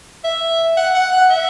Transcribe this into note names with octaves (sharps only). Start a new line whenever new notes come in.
E5
F#5
F#5
F#5
E5